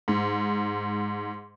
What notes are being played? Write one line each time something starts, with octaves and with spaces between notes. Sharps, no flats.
G#2